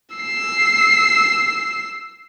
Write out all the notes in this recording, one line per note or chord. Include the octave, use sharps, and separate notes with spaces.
E6 C7